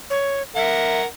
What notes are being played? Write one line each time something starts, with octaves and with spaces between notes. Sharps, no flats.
C#5
A#4 E5 F#5